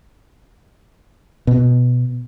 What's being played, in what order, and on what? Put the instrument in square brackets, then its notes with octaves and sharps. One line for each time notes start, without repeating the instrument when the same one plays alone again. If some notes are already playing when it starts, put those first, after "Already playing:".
[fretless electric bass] B2